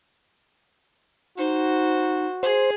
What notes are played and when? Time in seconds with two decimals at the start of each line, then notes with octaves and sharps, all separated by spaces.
1.38 D#4 F#4 C5
2.43 G#4 C5